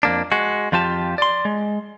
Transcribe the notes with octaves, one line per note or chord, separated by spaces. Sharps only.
F2 A#3 D4
G#3 F#4
F2 F3 F4 G4 A5
D5 C6
G#3